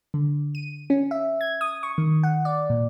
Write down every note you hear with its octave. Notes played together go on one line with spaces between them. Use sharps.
D3
D#7
C#4
E5
G#6
D#6
C#6
D#3
F#5
D5
A#2